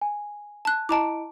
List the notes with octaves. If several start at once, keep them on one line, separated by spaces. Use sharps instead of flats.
G#5
A5 F#6
E4 D#5 A5 A#5 D6 D7